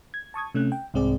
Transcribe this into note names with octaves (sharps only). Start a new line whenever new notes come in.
G#6
A5 C#6 D#6 G#6
C3 A3 C#4 F#6
G5
C2 G#2 C4 G#4 D5